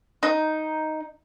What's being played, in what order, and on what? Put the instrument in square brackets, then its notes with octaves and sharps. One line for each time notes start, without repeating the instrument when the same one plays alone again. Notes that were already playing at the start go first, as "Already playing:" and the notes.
[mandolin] D#4